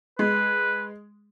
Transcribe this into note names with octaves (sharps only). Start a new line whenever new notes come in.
G#3 B4